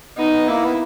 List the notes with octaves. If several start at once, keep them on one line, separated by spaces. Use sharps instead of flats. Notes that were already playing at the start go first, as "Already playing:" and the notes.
B3 D#4
B3
A#3 E4
B3